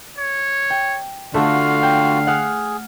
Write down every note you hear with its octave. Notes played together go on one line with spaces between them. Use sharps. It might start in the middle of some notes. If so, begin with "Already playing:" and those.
C#5
G5
D3 A3 F4 F#4 F5
G5
G#4 F#5 F6